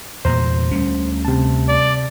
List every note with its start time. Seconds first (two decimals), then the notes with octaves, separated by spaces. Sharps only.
0.25 E2 A#2 C5 A#5
0.71 D2 G3 C#4
1.25 C3 A5
1.68 D5